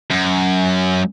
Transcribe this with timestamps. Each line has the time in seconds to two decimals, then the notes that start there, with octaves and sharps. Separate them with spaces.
0.10 F#2